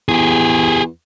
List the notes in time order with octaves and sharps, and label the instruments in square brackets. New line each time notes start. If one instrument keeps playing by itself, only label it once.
[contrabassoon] E2 [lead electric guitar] G4 G#4